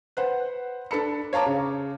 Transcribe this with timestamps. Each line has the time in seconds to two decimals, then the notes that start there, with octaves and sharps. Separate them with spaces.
0.17 B4 C5 F#5
0.91 D4 A4 B5 C#7
1.33 C#5 F5 A5 A#5 D6
1.46 C#3